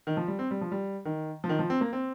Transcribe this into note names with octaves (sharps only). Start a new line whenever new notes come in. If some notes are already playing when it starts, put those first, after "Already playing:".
D#3
F3
G3
C4
G3
F3
G3
D#3
F3
D#3
F3
C4
A#3
C4